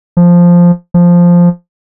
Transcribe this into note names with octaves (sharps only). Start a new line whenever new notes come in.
F3
F3